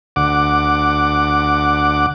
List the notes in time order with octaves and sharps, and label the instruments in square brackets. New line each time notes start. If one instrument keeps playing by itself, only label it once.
[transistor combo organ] D2 F#5 D6